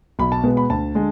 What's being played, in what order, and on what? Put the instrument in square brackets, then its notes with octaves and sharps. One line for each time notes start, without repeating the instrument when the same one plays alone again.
[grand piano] B1 B5
A5
B2 G#3 B3
B5
D2 A5
D3 G#3